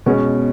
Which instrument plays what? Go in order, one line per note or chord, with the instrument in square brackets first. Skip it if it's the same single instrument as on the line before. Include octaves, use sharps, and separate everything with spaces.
[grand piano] B2 G#3 C#4 [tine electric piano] B3